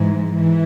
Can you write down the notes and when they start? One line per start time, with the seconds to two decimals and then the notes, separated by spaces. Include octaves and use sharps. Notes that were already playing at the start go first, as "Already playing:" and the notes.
Already playing: G#2 E3
0.35 E3